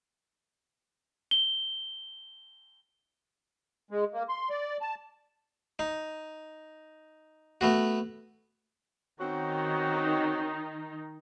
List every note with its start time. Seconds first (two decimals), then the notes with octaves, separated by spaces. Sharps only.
1.31 G7
3.91 G#3
4.13 A#3
4.29 C6
4.50 D5
4.81 A5
5.79 D#4
7.61 A3 B3 F#4
9.20 D#3 C4 C#4 D#4 F#4